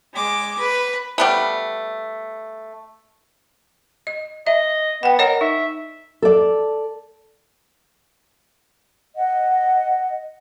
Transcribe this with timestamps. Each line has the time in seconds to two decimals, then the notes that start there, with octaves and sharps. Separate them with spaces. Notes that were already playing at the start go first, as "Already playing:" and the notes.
0.14 G#3 D6
0.59 B4
1.18 G3 A3 B3
4.07 D#5
4.47 D#5 E5
5.03 B3 F#5 G5
5.19 A#4 C#5 D#5 F#5
5.41 D#4 E5
6.22 A4 D5
9.15 D#5 F#5